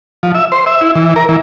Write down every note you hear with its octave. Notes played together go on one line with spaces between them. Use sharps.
F3
E5
C5
E5
E4
E3
A#4
E3